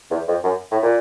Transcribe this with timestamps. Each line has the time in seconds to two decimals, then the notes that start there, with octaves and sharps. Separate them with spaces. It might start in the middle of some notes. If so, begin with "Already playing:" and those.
0.10 E2
0.28 F2
0.44 F#2
0.72 A2
0.83 A#2